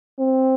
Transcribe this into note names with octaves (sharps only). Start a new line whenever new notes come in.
C4